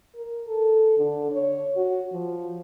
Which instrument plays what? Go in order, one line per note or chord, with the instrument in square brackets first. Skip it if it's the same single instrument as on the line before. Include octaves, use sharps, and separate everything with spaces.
[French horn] A#4
A4
D3
C#5
F#4
F3